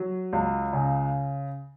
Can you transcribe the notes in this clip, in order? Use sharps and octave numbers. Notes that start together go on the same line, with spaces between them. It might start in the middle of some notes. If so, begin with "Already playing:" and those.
Already playing: F#3
C#2
C#3